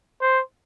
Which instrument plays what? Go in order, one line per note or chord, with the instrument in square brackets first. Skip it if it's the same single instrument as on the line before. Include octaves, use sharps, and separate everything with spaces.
[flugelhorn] C5